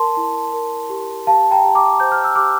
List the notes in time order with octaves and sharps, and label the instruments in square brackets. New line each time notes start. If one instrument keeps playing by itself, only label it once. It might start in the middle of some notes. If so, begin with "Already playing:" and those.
Already playing: [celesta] A#4 A5 C6
E4
A#4
G4
G4 F5 A5
G5 A#5
G4
A#5 D6
C5 G6
F6
E6
G4 D6 F6